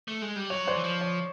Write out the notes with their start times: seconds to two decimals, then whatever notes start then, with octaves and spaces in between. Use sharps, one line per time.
0.08 A3
0.22 G#3
0.36 G3
0.50 F#3 C#5
0.67 C5 D5
0.76 E3
0.84 F3
1.01 C#5